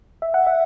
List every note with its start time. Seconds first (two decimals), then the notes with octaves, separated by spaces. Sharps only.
0.22 E5
0.34 F#5
0.47 E5